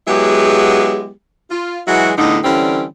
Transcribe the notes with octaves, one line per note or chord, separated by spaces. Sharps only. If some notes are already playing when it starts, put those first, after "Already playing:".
F#3 G#3 B3 E4 G4 G#4
F4
E3 F#3 G#3 E4 F#4
E2 A2 D3 D#4
D3 E3 G3 C4 C#4